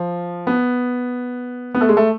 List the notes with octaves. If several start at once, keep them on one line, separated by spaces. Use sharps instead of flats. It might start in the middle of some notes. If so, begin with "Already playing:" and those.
Already playing: F3
B3
B3
A3
G#3
A3